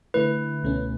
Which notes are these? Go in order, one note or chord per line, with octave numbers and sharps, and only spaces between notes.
D3 A3 E4 B4
C#2 B2 A3 C#4